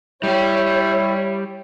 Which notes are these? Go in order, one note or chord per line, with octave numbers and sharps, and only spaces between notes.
G3 E4 G4 C#5